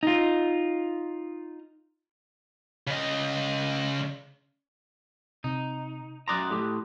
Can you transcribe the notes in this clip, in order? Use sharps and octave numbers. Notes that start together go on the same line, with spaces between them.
D#4 F4
C#3 D#5
C3 D#4
F#2 D5 A#5 C6 D#6 F#6
A2 G4